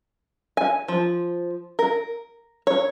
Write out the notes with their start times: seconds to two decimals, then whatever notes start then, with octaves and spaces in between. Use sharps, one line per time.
0.57 G#5
0.88 F3
1.79 A#4
2.67 C#5